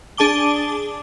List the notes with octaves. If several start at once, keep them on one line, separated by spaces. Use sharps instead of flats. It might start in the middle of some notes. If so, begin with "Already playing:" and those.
D4 G#4 A5 D6 G7